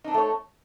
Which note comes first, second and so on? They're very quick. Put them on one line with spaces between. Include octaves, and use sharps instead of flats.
D#4 D4 C4 A3 C#5